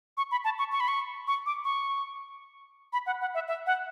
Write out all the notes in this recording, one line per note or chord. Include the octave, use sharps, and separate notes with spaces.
C#6
B5
A5
C#6
C#6
B5
C#6
C#6
D6
C#6
B5
F#5
F#5
E5
E5
F#5